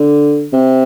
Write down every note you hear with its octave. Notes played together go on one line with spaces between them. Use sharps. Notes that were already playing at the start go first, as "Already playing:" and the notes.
Already playing: D3
C3